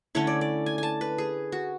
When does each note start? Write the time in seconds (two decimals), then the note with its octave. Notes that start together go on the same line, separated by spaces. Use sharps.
0.15 D3 A3 C#4 E4 C#5
0.27 D5
0.41 D5
0.66 G#5
0.78 G#5 A5
1.01 B4
1.18 G#4
1.52 F#4